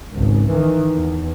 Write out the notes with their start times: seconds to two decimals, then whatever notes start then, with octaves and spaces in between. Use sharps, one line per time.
0.14 G#1 C#2
0.51 D#3 E3
0.94 E2